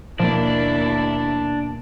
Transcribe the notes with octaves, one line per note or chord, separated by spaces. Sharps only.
D#2 B2 F3 A#3 D4 E4